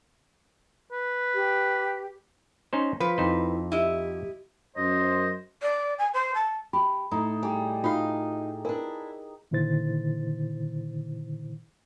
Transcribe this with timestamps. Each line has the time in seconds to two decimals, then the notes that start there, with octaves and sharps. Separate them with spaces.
0.92 B4
1.34 G4
2.73 C#4 D#4 C5
3.00 F3 B4
3.18 F2 D#4 E4 C5
3.72 E4 G4 D#5
4.77 F#2 C5 D#5
5.62 D5
5.98 G#5
6.14 C5
6.35 A5
6.73 G4 B5
7.11 A2 D#4
7.43 G3 G4 G#4
7.84 D#4 F4 F#4 D#5 F5
8.65 D4 E4 A#4 B4 G#5
9.51 A#2 D3 D#3 E4 C5 A6